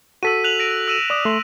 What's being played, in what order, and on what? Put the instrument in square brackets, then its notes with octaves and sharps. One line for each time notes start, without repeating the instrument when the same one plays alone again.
[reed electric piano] F#4 A4 [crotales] E6 B6 D#7
[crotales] F#6 F7 F#7
A#6 D7 D#7
E6 D#7 E7
[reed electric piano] D5 D6 D#6
A3 C6